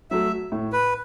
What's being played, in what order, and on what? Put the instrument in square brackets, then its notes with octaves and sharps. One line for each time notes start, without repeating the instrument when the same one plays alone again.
[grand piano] F#3 A3 [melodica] E5
[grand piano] A2
[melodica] B4